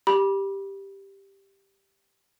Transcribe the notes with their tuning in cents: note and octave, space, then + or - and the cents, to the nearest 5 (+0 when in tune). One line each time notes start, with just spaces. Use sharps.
G4 +0 B5 -30